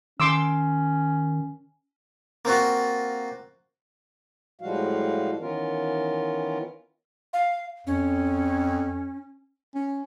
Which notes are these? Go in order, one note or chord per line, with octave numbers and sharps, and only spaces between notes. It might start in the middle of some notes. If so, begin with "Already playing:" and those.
D#3 C#4 C6 D6 E6
A#3 C4 F4 F#4
A2 F3 G3 G#3 F#4 F5
D#3 E3 B3 C#4 F4 A#4
F5
F2 C#4
C#4